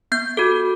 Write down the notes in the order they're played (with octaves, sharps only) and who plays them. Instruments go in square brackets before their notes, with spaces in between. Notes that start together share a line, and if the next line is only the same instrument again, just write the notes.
[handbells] B3 G6
F#4 A4